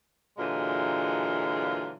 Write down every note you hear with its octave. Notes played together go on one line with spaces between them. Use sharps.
A#2 D3 E3 F#3 G#3 F4